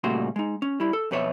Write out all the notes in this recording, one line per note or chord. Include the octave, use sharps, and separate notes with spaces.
A#2 C#3 G3 A3 F#4 C6
G#3 D#4
C#4
G3 E4
A4
F2 B2 B4 C#5 E5